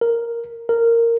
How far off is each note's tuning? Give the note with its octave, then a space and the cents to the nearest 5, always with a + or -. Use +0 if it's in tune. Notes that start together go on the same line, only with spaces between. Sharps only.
A#4 +0
A#4 -10